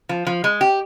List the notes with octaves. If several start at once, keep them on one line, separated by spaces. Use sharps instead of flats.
F3
F3
G#3
G4